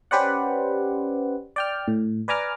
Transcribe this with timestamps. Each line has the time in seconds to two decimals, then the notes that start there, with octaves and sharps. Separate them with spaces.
0.11 C#4 G4 B4 C5 D5 F#5
1.56 D5 G5 F6
1.88 A2
2.28 B4 D5 G#5 A#5 D6 F6